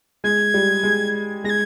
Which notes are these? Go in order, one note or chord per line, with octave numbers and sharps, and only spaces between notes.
G#3 G#6
G3
G#3
G#3 G#6 A#6